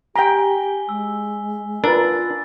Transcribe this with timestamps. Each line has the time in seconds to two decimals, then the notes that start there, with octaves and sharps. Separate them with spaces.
0.16 G4 G5 G#5 A#5 B6 G7
0.89 G#3 E6
1.84 D4 F4 A#4 B4 E6 A6